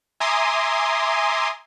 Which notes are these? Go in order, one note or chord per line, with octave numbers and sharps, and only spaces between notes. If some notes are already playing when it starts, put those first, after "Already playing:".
E5 G#5 A#5 C6 D6 D#6